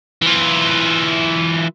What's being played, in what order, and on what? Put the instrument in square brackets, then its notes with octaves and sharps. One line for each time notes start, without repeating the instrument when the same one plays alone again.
[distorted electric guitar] E3 F4